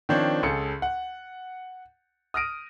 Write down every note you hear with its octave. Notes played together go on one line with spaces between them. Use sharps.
D#3 F3 C4 D4 C5 C#5
C#2 G#4 A4 C#7
F#5
D#6 F6 A#6 D7 D#7